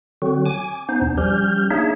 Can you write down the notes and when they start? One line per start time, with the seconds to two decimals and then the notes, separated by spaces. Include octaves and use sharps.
0.22 D3 F#3 C4 F#4
0.46 G#5 D6
0.89 B3 C#4 D#4 C5
1.02 E2 B2 D4
1.17 F3 G3 C#4 G4 F6 G6
1.71 A#3 D4 D#4 G#4 C#5 E5